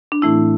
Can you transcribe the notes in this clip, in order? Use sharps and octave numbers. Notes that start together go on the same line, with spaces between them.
D4
A2 E3 A3 C4 E4